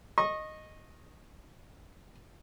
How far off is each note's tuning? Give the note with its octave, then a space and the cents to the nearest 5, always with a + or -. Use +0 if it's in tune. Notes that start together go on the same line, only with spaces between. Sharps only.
D#5 -5 C#6 -30